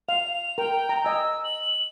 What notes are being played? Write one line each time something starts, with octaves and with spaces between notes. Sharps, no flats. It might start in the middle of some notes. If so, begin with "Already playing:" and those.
F5 F7
A#4 G5
A#5
D#5 G#5 E6
F#7